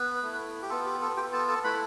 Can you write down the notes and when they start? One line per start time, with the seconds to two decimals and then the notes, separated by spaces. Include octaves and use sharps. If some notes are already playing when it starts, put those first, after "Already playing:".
Already playing: B3 B4
0.23 A3 E4
0.62 G4
0.70 B3 F4 A4
0.86 G4
1.01 A4
1.17 B3 F4 G4 G5
1.33 A4 A5
1.48 A4 A5
1.64 A3 E4 B4 B5